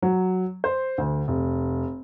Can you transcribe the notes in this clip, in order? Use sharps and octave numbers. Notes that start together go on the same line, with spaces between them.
F#3
C5
D2
F1